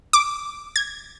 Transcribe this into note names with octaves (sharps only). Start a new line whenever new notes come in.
D6
G#6